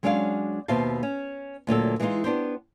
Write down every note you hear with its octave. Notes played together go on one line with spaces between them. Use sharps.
F#3 G#3 C#4 D4 D5 F5
D#2 B2 C5 E5 F5 A5
C#4
D2 A#2 F#3 A4
E3 G#3 C4 D4 D#4 F4
B3 D4 G4 C5